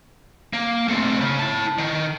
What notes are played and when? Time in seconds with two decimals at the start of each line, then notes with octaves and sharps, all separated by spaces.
0.53 A#3
0.88 A3 C4
1.21 C#3
1.39 E4 A5
1.78 D#3